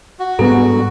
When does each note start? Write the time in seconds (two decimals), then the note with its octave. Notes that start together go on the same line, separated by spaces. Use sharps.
0.20 F#4
0.39 G#2 G3 B3 D4 G#4 A4 A#5